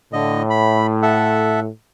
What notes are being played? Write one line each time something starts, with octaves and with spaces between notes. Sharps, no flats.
A2 D3 D#5
B5
A4 E5 F#5